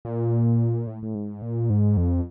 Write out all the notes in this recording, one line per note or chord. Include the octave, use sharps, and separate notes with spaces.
A#2
A2
A2
G#2
A#2
G#2
F2